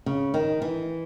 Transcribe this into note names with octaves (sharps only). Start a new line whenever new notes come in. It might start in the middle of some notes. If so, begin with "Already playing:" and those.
C#3
D#3
E3